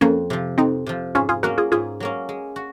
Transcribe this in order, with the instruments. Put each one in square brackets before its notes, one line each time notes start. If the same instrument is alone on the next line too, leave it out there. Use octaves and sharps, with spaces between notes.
[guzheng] F2 [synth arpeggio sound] A#3 C#4
[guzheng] C3 F3
[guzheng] F2 [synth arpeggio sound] C4 D#4
[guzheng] C3 F3
[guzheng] G#2 [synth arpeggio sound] C#4 F4
[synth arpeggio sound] F4 G#4
[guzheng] F#3 A#3 C#4 [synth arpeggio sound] F#4 A#4
[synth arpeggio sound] F4 G#4
[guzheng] G#2 [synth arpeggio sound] F4 G#4
[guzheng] F#3 A#3 C#4
G#3
F#4